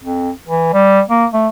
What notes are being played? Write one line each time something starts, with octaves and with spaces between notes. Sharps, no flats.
F2
E3
G3
A#3
A3